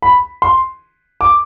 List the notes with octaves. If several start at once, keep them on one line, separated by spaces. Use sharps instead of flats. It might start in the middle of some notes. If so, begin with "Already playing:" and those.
B5
C6
D6